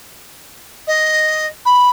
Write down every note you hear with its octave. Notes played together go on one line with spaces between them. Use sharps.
D#5
B5